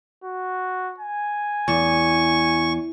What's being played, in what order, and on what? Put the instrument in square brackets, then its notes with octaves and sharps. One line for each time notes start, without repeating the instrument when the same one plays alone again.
[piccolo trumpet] F#4
G#5
[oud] E2 [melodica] C#6